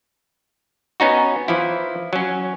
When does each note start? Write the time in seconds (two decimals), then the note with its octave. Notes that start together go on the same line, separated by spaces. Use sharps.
1.00 B3 C#4 D#4 F#4
1.48 E3 F3 E4
2.13 F#3 C#4